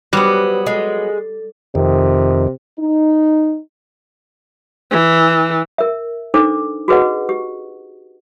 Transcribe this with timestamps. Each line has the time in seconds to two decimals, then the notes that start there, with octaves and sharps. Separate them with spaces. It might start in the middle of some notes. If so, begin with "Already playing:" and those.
0.13 F#3 G3 B3 B4 C5
0.66 G#3 A4
1.75 F2 C3 D#3
2.80 D#4
4.91 E3
5.78 A#4 E5
6.34 D4 D#4 A4 C5 D6
6.88 F#4 G#4 B4 D#5 F#5
7.29 G4